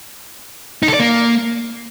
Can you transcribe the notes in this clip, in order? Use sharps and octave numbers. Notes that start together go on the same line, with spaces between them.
D#4
A4
D5
A#3